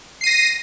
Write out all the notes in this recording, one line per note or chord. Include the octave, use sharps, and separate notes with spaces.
A#6 C7 D#7